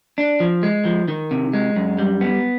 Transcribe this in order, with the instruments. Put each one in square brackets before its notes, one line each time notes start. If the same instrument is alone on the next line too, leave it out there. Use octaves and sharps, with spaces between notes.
[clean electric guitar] D4
F3
G#3
F3
D#3
C3
G#3
F#2
G3
B3